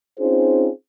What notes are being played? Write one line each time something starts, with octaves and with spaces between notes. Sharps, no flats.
C4 C#4 D#4 F4 G#4 C5